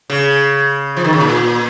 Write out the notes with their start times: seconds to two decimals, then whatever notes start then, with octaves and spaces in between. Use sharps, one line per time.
0.10 C#3
0.97 F3
1.05 D#3
1.13 C#3
1.21 A#2